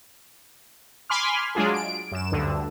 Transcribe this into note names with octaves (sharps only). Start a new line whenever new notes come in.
G#5 B5 C6 D6 F6
F#3 G#3 D4 F4 G#4
D7
F#2 E7
D2 G2 D3